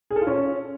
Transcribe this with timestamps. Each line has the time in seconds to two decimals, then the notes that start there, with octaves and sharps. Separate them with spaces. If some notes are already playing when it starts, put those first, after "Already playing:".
0.11 G#4
0.16 A4
0.21 F4
0.27 C#4